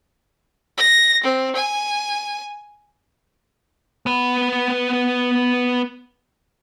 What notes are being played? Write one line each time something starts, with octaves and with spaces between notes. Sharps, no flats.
A#6
C4
G#5
B3 B4